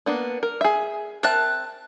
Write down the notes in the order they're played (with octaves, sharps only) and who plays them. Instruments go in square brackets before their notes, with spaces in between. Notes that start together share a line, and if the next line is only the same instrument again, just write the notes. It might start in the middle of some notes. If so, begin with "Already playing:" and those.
[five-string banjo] A#3 B3 D4
A#4
G#4 E5
[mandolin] C4 A5 F#6 [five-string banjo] A#4 E5